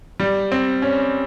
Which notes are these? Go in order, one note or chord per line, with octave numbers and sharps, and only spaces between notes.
G3
C4
C#4